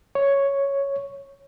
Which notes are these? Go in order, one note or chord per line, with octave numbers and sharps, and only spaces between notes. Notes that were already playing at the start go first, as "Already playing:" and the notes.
C#5